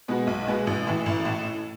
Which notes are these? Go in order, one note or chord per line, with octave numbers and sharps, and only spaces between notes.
B2 G#3 B3 F#4
B1
B2 G#3 B3 F#4
A1
A2 E3
A1
A2